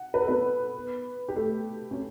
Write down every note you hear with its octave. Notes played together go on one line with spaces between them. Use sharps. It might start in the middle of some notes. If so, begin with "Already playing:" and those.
Already playing: F#5
B4
A4
B3 B4
G4
A3 A4
C#4